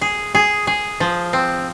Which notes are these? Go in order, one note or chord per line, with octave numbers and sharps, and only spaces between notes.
G#4
G#4
G#4
F3
C4